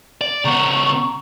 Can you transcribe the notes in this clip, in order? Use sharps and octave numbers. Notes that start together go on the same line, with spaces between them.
D5
C#3 B3 A#5 C#6